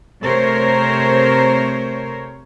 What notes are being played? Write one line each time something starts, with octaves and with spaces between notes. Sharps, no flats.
C3 A3 A#4 C5 C#5